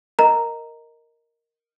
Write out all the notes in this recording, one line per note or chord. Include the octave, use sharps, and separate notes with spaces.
A#4 D#5 A#5